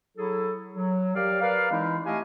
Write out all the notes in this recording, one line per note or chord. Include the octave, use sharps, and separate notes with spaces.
F#3 E4 G#4 A4
F#3
G4 A#4 D5 F5
A#4 B4 D5 F5
E3 G#3 C4 D#4 E4
A3 E4 G4 D#5 F5 G#5